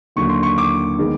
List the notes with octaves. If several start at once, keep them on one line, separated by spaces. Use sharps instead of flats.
D#2 D3 F#3 A#3 C#6
C6
C#6
D6
D#3 G#3 B3